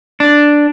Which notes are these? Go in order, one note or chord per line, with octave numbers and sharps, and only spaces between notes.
D4